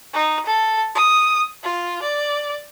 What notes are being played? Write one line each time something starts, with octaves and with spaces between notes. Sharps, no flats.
D#4
A4
D#6
F4
D5